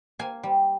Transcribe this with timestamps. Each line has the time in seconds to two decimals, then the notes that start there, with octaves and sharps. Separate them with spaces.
0.19 A#3 G#5
0.43 G3